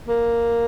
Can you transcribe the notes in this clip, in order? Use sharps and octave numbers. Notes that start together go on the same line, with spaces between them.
A#3